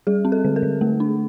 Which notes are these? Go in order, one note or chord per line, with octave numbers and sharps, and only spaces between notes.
G3 G#4
C4
A4
D3
A#4
D3
A3
D4